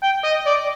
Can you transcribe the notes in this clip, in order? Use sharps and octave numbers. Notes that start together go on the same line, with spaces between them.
G5
D#5
D5